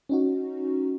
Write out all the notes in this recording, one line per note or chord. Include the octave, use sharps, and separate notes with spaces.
C#4 D#4 F#4